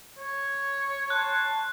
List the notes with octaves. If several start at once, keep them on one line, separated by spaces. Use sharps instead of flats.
C#5
A5 C6 F#6